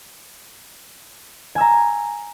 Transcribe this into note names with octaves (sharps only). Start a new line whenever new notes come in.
G#5 A#5 E6